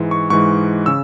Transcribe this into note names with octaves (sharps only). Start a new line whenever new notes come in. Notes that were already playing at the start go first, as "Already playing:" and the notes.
Already playing: G#2 E3 G#3
C#6
G#2 E3 G#3 C#6
C#3 E6